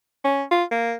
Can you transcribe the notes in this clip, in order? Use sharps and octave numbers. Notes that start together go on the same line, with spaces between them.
C#4
F4
A#3